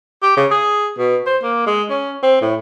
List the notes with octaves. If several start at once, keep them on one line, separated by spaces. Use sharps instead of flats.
G4
C#3
G#4
B2
C5
A#3
G#3
C#4
C4
A2